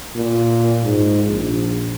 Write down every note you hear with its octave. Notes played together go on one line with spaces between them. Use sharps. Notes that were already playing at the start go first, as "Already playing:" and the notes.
A#2
G#2
A#1